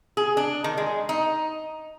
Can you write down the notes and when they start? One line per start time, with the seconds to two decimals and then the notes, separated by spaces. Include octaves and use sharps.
0.17 G#4
0.37 D4
0.64 D#3
0.77 G#3
1.09 D#4